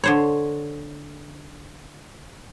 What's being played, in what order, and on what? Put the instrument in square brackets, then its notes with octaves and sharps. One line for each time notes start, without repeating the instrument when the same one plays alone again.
[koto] D3 C5 C#5